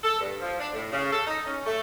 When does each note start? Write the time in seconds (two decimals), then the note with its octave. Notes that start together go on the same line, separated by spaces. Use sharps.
0.04 A4
0.21 G2
0.41 F3
0.60 D4
0.74 A2
0.92 C#3
1.12 A4
1.27 D#4
1.46 C#4
1.66 A3